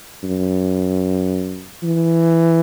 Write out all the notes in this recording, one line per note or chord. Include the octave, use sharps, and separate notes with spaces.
F#2
E3